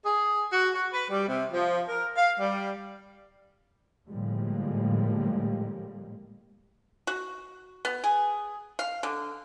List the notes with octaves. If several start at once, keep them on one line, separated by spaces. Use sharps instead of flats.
G#4
F#4
F#4
B4
G3
C3
F3
A#4
F5
G3
A2 D3 F3 G3 G#3 A#3
F#4
B3
G#4
F5
D3